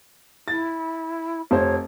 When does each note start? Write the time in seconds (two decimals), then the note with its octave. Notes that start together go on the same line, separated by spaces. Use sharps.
0.48 E4 A6
1.51 F1 C5 C#5